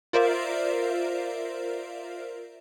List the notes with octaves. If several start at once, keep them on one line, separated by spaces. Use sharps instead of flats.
F4 A#4 C5 D5 E5 F5